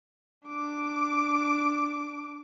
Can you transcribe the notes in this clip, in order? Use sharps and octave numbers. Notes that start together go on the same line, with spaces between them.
D4 D6